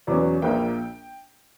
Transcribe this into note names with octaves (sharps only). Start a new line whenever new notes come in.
E2 B2 F#3 C#4 D5
A#1 A#2 A#3 G5